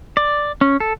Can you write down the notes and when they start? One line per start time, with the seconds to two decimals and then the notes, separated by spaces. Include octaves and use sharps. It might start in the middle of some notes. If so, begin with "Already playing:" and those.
0.17 D5
0.61 C#4
0.80 A4